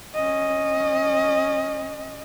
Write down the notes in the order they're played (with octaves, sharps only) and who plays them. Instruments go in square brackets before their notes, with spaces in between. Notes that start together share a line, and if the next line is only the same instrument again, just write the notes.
[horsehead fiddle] C#4 D#5